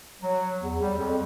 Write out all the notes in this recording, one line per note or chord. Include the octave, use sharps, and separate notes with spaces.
F#3
E2
G3
F2